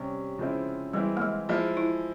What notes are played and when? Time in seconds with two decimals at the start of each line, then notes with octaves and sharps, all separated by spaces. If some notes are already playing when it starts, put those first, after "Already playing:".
Already playing: C3 G3 C#4
0.38 C#3 F3 G#3 C4 E4
0.93 E3 G3 G#3 C4 E4
1.17 A#3
1.22 G#3
1.49 F3 G#3 A#3 E4
1.77 E4